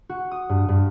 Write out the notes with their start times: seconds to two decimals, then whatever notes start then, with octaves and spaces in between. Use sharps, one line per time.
0.09 F#4
0.31 D#6
0.49 G2
0.69 G2